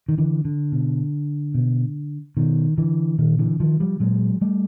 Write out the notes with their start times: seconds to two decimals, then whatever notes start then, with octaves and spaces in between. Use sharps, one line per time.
0.08 D#3
0.18 D3 E3
0.45 D3
0.72 B2
1.54 B2
2.37 B2 D#3
2.78 D3 E3
3.18 A#2 D#3
3.39 D3 E3
3.60 D#3 F3
3.80 F3 G3
4.00 A#2 F#3 G#3
4.41 G3 A3